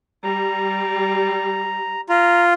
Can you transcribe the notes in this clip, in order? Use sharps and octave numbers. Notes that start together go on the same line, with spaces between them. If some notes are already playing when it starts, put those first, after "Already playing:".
G3 A#5
F4 A#5